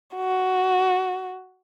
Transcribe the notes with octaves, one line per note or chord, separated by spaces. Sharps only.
F#4